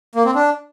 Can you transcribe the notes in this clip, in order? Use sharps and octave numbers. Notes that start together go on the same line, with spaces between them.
A#3
C4
D4